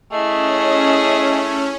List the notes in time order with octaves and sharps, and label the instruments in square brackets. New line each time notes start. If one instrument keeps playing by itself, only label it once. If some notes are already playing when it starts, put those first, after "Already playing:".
[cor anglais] A3 [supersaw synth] C#4 [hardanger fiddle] E4 G#4 [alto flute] D#5